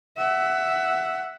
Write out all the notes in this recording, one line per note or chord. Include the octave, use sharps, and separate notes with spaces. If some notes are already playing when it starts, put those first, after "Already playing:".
E5 F#5